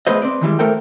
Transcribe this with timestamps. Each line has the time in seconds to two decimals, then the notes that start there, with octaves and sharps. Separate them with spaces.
0.07 A3 B3 G#4 B4 C5 D#5
0.22 C4 B4 D5
0.41 D#3 E3 G3 G#3
0.59 A3 A4 A#4 C5 G5